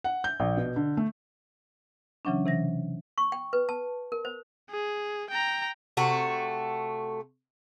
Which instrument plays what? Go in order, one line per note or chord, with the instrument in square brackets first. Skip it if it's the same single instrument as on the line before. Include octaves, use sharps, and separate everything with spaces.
[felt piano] F#5
G6
A#1
B2
D3
A3
[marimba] C#3 E3 F#3 C#4 D4
C3 E3 A#6
[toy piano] C#6
G5
B4
A5
A#4
C5
[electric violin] G#4
G5 A#5
[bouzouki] C3 A3 F#4